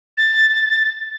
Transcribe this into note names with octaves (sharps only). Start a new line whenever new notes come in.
A6